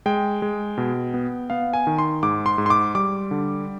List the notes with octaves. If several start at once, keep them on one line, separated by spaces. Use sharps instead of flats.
G#3 G5
G#3
B2
B3
B3 F5
G#5
D#3
C6
G#2 D6
C6
G#2
C6
D6
G3 D6
D3